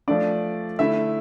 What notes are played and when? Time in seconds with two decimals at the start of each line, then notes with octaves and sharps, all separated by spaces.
0.08 F3 A3 D4 D5
0.79 D3 A3 E4 E5